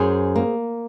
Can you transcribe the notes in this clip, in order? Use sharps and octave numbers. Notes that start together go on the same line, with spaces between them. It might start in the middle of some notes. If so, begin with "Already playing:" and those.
Already playing: F#2 G#4 C5
A#3